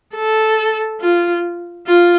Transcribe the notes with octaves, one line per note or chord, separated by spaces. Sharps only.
A4
F4
F4